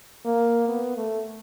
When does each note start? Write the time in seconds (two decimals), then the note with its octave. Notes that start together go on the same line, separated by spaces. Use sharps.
0.25 A#3
0.68 B3
0.97 A3